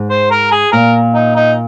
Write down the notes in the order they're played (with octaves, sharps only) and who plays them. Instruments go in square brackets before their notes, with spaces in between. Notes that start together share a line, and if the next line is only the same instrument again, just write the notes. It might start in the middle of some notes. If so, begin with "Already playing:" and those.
Already playing: [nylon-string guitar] G#2
[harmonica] C5
A#4
G#4
[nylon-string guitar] A#2 [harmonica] A#4
[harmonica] D#4
D#4